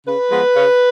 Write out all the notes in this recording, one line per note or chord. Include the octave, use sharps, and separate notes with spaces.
C#3 B4
F3 G#3 B3
C#3